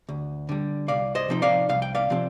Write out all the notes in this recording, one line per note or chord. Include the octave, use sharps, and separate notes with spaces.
D2
D3 G3
C2 D5 F5
C5 D#5
C3 F3 C4 D#4
D5 F5
C2 F5
G5
D5 F5
C3 F3 C4